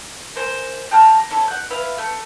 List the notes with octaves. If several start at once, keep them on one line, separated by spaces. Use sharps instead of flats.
A#4 C5 G#5
G4 A5 A#5 F6
C#4 E4 A4 C#5
F#5 G6
E4 B4 F5
A3